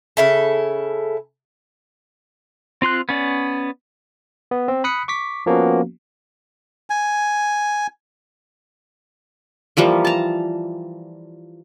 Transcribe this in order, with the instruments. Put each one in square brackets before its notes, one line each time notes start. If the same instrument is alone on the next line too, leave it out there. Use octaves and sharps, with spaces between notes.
[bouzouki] C#3 E4 A4
[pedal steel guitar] C4 F4 C6 F#6
B3 C#4 D5
[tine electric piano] B3
C4
B5 D#6 F#6 B6 C#7
C#6 D6 B6
F3 A#3 B3 C#4 F#4
[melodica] G#5
[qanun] E3 F3 G3 A#3
A5 A#5